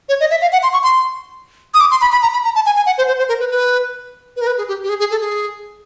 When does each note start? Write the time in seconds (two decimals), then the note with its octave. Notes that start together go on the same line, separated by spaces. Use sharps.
0.09 C#5
0.20 D#5
0.31 E5
0.42 F5
0.52 F#5
0.63 C6
0.73 C#6
0.83 C6
1.74 D#6
1.80 D6
1.91 C6
2.01 B5
2.12 B5
2.22 A#5
2.33 B5
2.45 A#5
2.55 A5
2.66 G#5
2.76 G#5
2.86 F#5
2.98 C5
3.08 C5
3.18 C5
3.29 A#4
3.40 B4
3.51 B4
4.36 B4
4.41 A#4
4.47 B4
4.58 G#4
4.68 G4
4.83 G4
4.89 G#4
5.00 G#4
5.11 A4
5.20 G#4